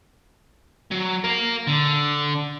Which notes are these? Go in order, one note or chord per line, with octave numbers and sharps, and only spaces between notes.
F#3
A#4 F5
D3